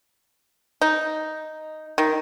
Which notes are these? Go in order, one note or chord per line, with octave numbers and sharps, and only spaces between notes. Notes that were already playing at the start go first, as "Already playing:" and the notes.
D#4
D#3